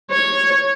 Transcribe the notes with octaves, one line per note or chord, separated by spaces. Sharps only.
C#5